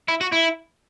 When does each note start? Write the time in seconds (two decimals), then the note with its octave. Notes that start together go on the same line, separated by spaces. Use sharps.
0.08 E4
0.21 F#4
0.32 E4